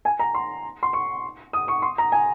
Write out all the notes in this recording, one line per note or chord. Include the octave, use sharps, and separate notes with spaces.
G#5
A#5
C6
C6
C#6
D#6
C#6
C6
A#5
G#5